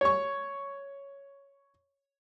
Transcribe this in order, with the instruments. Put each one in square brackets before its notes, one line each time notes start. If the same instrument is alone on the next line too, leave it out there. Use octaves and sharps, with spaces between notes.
[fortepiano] C#5 C#6